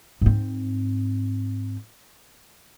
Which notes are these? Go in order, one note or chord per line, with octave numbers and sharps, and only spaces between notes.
G#2 C4